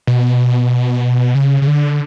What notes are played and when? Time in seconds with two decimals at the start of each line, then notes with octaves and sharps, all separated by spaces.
0.07 B2
1.35 C#3
1.62 C#3
1.67 D3